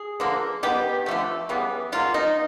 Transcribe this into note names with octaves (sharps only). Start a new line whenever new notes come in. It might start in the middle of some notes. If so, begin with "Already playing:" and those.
Already playing: G#4
D3 F3 A#3
D#3 G3 B3 G4
D3 F3 A3
C#3 E3 G3 B3
C#3 F#3 A#3 F4
D#4